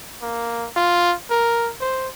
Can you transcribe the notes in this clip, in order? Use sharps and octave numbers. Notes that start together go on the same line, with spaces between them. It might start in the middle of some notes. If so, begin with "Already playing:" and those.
A#3
F4
A#4
C5